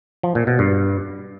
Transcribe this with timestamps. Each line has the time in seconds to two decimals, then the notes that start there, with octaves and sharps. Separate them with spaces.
0.23 F3
0.35 A#2
0.47 B2
0.59 G2